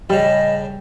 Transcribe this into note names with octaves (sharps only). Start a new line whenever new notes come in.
A2 C#3 G3 D#5